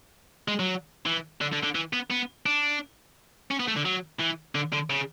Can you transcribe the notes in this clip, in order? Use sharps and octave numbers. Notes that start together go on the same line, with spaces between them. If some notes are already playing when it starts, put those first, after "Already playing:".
G#3
F#3
E3
D3
D3
D3
E3
B3
B3
D4
C#4
B3
A3
D3
F#3
E3
D3
D3
C#3